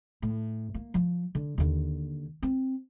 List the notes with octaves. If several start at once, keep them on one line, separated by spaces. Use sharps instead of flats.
A2
A#3
F3
D3
D#2 D3
C4